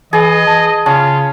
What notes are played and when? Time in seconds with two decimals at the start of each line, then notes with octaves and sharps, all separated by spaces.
0.13 E3 G#4 D#5
0.47 E3 A5
0.86 C#3 C#4 F4 A5